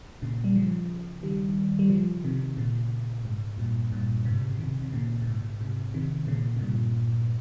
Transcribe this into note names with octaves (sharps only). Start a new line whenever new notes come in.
A#2 C#3
G3
C#3 F3
D#3 G3
G3
C#3 F3
C3 D#3
A#2 C#3
G#2
G2 A#2
G2 A#2
G#2 C3
C#3
C3 D#3
C3
A#2 C#3
A#2
G#2
G#2 C3
C3 D#3
A#2 C#3
C3
G2 A#2